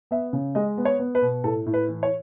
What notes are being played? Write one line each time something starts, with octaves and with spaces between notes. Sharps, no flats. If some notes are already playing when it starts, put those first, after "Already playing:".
B3 E5
C#3
G#3 D#5
B3
C#5
B3
B4
B2
A2 A4
A2
B4
E3
C#5